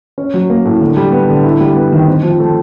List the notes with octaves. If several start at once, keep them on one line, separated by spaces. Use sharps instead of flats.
C#4
F#3
A#3
A2
D3
G3
B3
D3
E4
G3
B3
D#3
C4
F3
A3